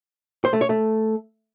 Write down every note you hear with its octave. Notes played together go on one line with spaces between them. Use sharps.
C5
A3
C#5
A3